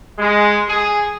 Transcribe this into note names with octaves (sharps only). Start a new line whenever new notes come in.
G#3
G#4